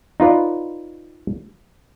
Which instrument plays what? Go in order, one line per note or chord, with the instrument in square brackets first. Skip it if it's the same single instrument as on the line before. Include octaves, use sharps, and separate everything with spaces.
[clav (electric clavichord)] D#4 F4 B4 D5